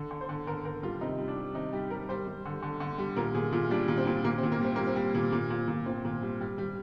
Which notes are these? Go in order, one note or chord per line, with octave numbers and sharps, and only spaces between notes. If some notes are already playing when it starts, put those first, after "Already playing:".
Already playing: D3
D3
C5
D3
D3 A#4
D3 A#4
G3 F4
C3 D#4
G3
D4
G3
C3 D#4
G3 G4
G3 A#4
G3 C5
G3
D3
D3
D3
G3
A#2 A#4
A#2 G#4
A#2 F4
G3 D4
A#2
C4
A#2
A#2 A#3
C4
A#2
A#3
G3 C4
G3 A#3
C4
G3
A#2
A#2
A#2
A#2
A#2 C4
A#2
G3
G3
G3